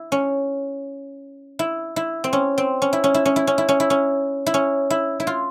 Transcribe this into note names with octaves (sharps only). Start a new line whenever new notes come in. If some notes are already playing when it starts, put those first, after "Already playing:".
Already playing: E4
C#4
E4
E4
C4
C#4
C4
C#4
E4
C#4
E4
C#4
E4
C#4
E4
C#4
E4
C#4
E4
C#4
E4
E4
F4